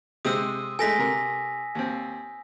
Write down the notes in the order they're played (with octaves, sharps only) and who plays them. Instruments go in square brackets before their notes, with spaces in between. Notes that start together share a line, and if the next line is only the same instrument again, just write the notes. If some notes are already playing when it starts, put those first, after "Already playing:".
[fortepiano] C3 G#3 C4 [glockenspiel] D#6 E6 D#7
[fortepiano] G#3 A3 A4 [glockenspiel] G#5 A#6 B6
[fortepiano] C3 A#4
D#2 C4